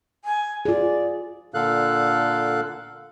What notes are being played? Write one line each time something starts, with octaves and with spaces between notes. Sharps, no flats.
G#5
F4 G#4 D5
A#2 D3 A4 F5 F#6